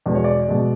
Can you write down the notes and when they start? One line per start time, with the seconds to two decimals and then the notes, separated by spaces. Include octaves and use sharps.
0.06 E2 B2 G#3 D5
0.15 C#5
0.24 D5
0.48 B2 G#3